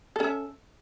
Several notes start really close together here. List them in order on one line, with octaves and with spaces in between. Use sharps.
A4 C#4 E5